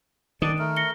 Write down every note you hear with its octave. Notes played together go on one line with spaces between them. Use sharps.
D#3 D4 D5 D#6 D7
A3 A#4
A#6 C#7 G7